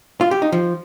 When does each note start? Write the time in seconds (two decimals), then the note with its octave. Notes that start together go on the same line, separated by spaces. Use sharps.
0.21 F4
0.31 G4
0.42 D#4
0.52 F3